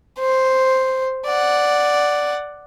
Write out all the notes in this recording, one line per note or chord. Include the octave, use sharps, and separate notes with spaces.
C5
D5 F#5